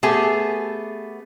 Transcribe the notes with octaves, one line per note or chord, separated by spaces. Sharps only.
A3 B3 G4 G#4 G#5